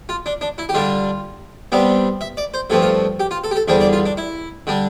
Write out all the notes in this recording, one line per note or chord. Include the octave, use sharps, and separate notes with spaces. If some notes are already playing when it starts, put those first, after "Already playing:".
F4
D4
D4
E4
G4
D3 G3 D4 F4
C3 G3 B3 D4
E5
D5
C5
G2 F3 A3 C4 A4
F4
G4
F4
A4
G4
A4
E2 D3 G3 D4 C5
D5
F4
D4
E4
D3 G3 D4